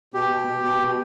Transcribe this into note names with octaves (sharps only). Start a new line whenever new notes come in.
B2 G4
B2
B2
B2
B2